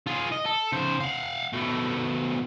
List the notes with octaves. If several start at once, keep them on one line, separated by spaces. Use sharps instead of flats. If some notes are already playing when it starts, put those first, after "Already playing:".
F4 G#4
D#5
A4
C#3 C5
F5 F#5
B2 A3